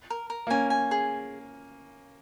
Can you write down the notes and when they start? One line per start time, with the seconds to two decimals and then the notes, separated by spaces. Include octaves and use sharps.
0.10 A#4
0.30 A#4
0.47 A#3
0.50 C#4 G#5
0.70 G#5
0.91 G#4